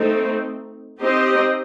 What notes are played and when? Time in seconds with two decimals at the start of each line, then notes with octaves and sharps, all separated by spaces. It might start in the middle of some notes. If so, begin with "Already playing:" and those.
Already playing: A3 C4 D#4
1.00 C4 D#4 G4 C5 D#5